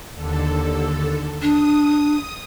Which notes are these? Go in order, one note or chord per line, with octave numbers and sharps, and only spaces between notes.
D#2 D3 A4
D4 D#6